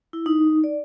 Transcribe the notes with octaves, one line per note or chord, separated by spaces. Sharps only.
E4
D#4
D5